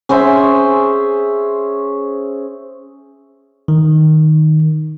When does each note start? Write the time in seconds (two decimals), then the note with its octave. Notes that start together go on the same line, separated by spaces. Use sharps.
0.09 C#4 G#4 C5 E5
3.68 D#3